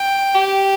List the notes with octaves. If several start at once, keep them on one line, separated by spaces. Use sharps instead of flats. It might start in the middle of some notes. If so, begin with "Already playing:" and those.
Already playing: G5
G4